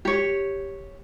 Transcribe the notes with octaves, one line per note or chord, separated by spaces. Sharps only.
G4 C#5